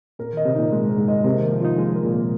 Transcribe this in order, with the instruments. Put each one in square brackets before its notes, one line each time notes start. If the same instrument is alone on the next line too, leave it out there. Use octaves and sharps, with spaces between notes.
[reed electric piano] A#2 [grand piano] A#4
[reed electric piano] D#3 [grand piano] D#5
[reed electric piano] C3
[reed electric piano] A#2 [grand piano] D#4
[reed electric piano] G#2 [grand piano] G#3
[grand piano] A#4
[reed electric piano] G#2
[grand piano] D#5
[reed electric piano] C3 [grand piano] A#4
[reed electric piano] D#3 [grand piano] A#3
[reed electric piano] F3
[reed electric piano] D#4 [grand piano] F4
[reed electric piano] G#3 [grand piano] A#3
[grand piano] A#4
[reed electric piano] A#2
[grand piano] A#3